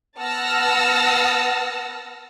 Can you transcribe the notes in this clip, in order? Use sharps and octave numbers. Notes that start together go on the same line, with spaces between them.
B3 F#5 A5 E6 F6 A#6